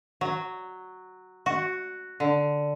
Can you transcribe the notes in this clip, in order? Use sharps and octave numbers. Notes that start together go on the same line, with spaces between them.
F#3
F#4
D3